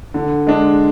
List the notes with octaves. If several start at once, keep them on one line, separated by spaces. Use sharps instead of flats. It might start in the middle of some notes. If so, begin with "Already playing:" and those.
D3
G#3 D4